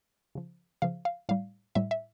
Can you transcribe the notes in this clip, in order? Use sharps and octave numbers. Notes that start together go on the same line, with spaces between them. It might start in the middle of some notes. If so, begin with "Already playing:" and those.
C#3 F3
C#3 F3 F5
F5
A2 G3 F5
A2 G3 E5
E5